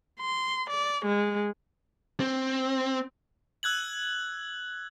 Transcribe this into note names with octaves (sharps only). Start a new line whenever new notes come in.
C6
D5
G#3
C4
E6 F#6 G#6 F#7